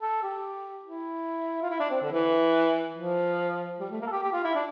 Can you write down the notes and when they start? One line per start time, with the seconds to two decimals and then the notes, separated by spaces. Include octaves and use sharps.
0.01 A4
0.22 G4
0.85 E4
1.62 F4
1.70 E4
1.80 D4
1.90 C4
2.02 D3
2.12 E3
2.96 F3
3.80 G3
3.91 A3
4.01 A#3
4.07 A4
4.11 G4
4.23 G4
4.32 F4
4.44 E4
4.55 D4